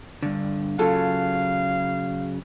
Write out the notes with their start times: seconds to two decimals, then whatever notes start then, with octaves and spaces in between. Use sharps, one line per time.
0.23 G2 D3
0.79 C#3 F#3 F4 A4 F5